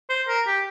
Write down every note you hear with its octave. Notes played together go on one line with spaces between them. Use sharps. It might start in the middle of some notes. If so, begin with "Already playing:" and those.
C5
A#4
G4